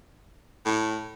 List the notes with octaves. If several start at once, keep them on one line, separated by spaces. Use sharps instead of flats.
A2